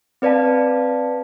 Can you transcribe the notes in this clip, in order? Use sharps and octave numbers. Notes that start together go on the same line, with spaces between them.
C4 B4 D5 F5 A5